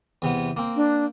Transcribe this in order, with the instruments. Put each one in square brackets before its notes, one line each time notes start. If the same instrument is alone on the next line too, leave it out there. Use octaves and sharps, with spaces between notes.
[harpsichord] E2 C3 B3
A#3 C4
[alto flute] D4